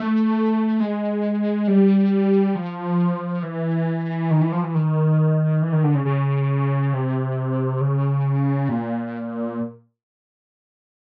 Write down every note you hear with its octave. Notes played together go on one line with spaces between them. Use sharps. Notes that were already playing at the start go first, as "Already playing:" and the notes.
Already playing: A3
G#3
G3
F3
E3
D#3
E3
F3
E3
D#3
E3
D#3
D3
C#3
C#3
C3
C#3
A#2